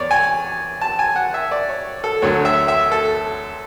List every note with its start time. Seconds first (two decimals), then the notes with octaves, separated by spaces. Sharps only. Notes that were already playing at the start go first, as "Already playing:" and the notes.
Already playing: E2 C#5 D5
0.11 G#5
0.81 A5
0.99 G#5
1.16 F#5
1.34 E5
1.51 D5
1.69 C#5
2.04 A4
2.22 D2 D3 F#3 C#5
2.45 E5
2.68 E5
2.92 A4